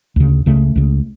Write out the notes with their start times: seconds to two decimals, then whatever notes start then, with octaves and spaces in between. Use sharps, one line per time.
0.16 D2 C#3
0.46 C#2 C#3 A3
0.76 C#2 C#3